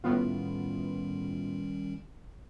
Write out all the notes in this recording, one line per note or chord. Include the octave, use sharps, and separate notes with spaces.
A2 D#3 G3 B3 C#4 F4